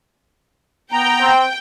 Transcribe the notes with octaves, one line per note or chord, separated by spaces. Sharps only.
B3 G5 A#5 G6
C4